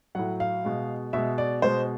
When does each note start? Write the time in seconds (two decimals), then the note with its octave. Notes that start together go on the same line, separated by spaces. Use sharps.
0.15 A2 F#3 F#5
0.40 F5
0.65 B2 G#3
1.13 B2 G#3 E5
1.38 D5
1.62 B2 G#3 C5